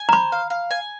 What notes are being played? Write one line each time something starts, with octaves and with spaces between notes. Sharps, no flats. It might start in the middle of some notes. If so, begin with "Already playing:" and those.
Already playing: G#5
A#5
C5 B5
F5
F5
G#5